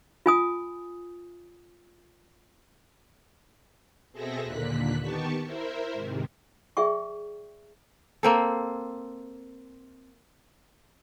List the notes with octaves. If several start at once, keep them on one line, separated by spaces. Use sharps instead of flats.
F4 G#5 D#6
B2 C4 G#4 A4 E5 A#6
D#2 A#2 D3 F#6 B6
D#3 B3 G4 A5 C#6
E4 A#4 C5 E5
G#2 C3 D#3
G#4 D5 E5 G5 C#6
A#3 C4 A4